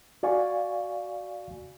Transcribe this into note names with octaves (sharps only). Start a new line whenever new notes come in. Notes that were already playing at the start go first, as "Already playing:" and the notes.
F#4 D5 F5 G#5 C#6